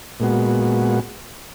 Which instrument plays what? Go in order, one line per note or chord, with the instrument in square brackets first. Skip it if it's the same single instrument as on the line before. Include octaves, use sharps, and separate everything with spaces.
[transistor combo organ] A#2 G#3 B3 F#4